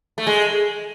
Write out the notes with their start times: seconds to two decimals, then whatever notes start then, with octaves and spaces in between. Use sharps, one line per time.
0.18 A3
0.27 G#3